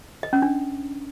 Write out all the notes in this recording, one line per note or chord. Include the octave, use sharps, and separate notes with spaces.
D#5
C#4
D4